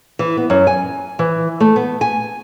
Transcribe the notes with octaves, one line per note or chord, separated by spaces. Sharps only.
E3
B3
F#2
G#5
E3
A3
B3
G#5